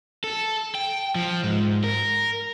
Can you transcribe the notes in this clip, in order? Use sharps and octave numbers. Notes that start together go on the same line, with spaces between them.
A4
G5
F3
G#2
A#4